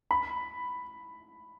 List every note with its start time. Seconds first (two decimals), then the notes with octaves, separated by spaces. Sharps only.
0.11 B5